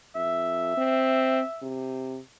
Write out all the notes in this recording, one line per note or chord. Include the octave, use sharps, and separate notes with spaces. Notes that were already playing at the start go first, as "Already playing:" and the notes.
F2 E5
C4
C3